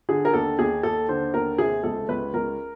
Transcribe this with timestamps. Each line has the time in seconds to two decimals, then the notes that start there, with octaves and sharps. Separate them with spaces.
0.09 D3 G#4
0.25 A#4
0.34 D#2 A4
0.58 D#2 G#4
0.83 D#2 A4
1.09 D3 C5
1.34 D#2 A#4
1.58 C3 G#4
1.83 C#2 A4
2.09 C#2 B4
2.34 C#2 A#4